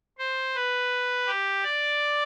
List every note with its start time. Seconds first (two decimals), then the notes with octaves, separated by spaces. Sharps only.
0.18 C5
0.55 B4
1.26 G4
1.63 D5